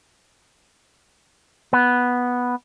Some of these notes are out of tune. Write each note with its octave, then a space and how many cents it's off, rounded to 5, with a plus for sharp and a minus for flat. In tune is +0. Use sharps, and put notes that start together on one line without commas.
B3 -5